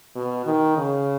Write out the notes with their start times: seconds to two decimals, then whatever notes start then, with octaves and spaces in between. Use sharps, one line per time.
0.15 B2
0.46 D#3
0.77 C#3